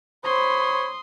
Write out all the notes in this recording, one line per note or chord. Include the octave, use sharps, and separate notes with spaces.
C5 C#5 B5 C6 D#6